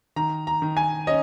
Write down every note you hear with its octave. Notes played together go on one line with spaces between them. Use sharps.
D#3 A#5
A#5
D#3
G#5
C#4 D#5